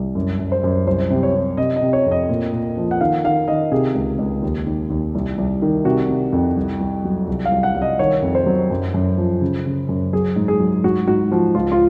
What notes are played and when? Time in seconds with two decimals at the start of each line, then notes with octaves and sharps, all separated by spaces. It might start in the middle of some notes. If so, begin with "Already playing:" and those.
Already playing: C2
0.15 F#2
0.39 F#2
0.52 C5
0.64 F#2
0.87 C2 C5
1.11 C3
1.23 C#5
1.34 C3
1.57 C3 D#5
1.76 D#5
1.81 C3
1.93 C#5
2.06 F2
2.11 D#5
2.29 A#2
2.52 A#2
2.77 F3
2.91 F#5
3.01 D#3 F5
3.24 D#3 F5
3.48 D#3 D#5
3.72 C3 G#4
3.95 C#2
4.19 C#2
4.42 D#2
4.66 D#2
4.90 D#2
5.15 C2
5.38 C2
5.62 D#3
5.85 C3 F#4
6.09 C3
6.33 F2
6.57 C2
6.81 C2
7.05 F#3
7.27 C2
7.45 F5
7.52 C2
7.63 F#5
7.76 C2
7.82 D#5
7.99 D#3 C#5
8.22 F2
8.35 C5
8.46 F#3
8.71 F#2
8.94 F#2
9.18 F3
9.41 C#3
9.66 C#3
9.89 F#2
10.13 F#3 G#4
10.36 G#2
10.48 G#4
10.60 F#3
10.84 G#2 F#4
11.07 G#2 F#4
11.31 F3 F#4
11.55 C#2 F4
11.72 F4